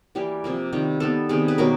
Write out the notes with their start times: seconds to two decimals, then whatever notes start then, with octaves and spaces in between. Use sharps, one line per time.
0.15 E3 G3 A#3 G4
0.44 C3 F3 A#3
0.73 C3 D#3 G3
1.00 D#3 G3 B3 A4
1.29 C3 D#3 G3 B3 G#4
1.48 B4
1.58 B2 F#3 A#3 A#4